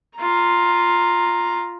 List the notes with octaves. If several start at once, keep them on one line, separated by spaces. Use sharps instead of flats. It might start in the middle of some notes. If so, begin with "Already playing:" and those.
F4 A#5